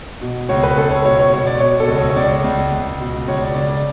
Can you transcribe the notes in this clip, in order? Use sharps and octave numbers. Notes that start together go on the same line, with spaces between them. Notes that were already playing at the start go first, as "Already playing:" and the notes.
B2
C#2 C#5
B4
C#2 A4
C#5
B2 C#5
C#5
B2 C#5
D5
B2 C#5
A4
C#2
C#5
C#5
C#2 D5
C#2
C#2
B2
C#2 C#5
D5
C#3 D5
D5